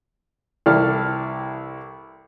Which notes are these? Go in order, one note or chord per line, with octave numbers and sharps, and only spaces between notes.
C2 E3 G4 A4 D5 F6